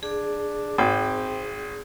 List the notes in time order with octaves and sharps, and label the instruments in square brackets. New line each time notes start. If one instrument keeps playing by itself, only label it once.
[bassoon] D4 [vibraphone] G#4
[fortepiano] G#1 [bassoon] C4 [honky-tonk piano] G5